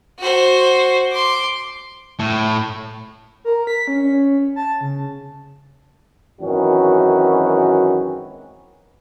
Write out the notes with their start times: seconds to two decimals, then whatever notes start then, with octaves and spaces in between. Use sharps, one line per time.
0.19 F#4 C5
1.12 C6 D6
2.19 A2
3.45 A#4
3.67 B6
3.88 C#4
4.03 C#4
4.56 A5
4.81 C#3
6.41 G#1 F#2 D#3 E3 C#4 F#4